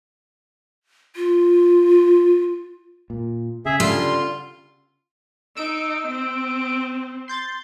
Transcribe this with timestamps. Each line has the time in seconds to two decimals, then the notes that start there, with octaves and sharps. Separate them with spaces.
1.16 F4
3.10 A#2
3.66 C#3 G#4 E5
3.80 D3 G3 F4 C6
5.57 D#4 E6 D7
6.07 C4
7.28 C6 G6 A6